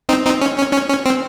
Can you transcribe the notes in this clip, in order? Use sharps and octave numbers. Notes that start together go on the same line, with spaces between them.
C4 D#4
C4 D#4
C#4
C#4
C#4
C#4
C4